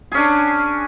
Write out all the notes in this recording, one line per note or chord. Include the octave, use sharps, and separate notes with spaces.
C#4 D4 G#4